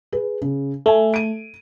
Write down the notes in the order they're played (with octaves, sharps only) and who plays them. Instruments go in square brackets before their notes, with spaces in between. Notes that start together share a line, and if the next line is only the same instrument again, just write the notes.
[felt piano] G#4 B4
C#3
[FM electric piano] A3 [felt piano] E5 G#5
[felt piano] D7 D#7